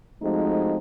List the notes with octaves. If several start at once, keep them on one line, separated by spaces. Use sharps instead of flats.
F3 G#3 A3 C4 D#4 F#4